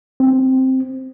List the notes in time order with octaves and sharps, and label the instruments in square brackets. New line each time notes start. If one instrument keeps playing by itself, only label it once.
[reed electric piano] C4